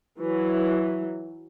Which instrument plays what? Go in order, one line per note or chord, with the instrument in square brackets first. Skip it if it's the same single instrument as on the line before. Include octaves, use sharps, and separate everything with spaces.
[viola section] E3 F#3